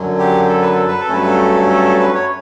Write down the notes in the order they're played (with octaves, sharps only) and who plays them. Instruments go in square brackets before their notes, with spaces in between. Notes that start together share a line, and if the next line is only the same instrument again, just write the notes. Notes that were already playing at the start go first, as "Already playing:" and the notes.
Already playing: [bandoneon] F#2 D3 F#3
G4
A4
B4
A4
B4
A4
G2 F#3 A3 C#4 B4
A4
A4
A4
B4
C#5